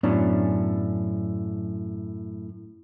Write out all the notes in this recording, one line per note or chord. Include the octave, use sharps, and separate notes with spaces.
F#2 A2 B3 C#4 D4